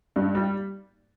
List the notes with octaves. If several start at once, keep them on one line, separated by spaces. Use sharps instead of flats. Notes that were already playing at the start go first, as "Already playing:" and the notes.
G2
G3